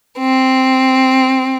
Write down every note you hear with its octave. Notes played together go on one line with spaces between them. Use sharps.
C4